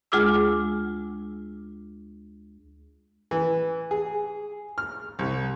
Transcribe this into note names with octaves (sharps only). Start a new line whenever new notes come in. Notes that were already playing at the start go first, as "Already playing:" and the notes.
D2 G#3 F4 G#4 D6 E6
E3
G#4
F6
C2